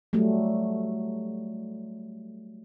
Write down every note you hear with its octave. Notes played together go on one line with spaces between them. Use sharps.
F#3 G3 A3